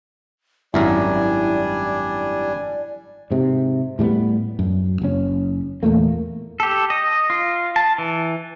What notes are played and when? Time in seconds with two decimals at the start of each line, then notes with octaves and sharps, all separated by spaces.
0.74 G#1 F#2 G3 D4 E4 A#4 D5 G#5
3.31 G#2 C3
3.99 A2 G3 G#3 B3
4.59 F#2
5.02 F#1 C#4
5.83 E2 A#2 A3 A#3
6.60 G4 A4
6.90 D#5
7.30 F4
7.76 A5
7.98 E3